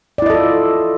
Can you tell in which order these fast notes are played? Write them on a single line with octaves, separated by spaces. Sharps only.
D5 E4 D#5 A4 F4